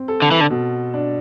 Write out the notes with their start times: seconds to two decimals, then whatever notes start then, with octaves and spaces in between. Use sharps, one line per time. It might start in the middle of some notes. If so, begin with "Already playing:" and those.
Already playing: C4
0.08 A4
0.22 D3
0.31 E3
0.41 D3
0.50 B2
0.94 D4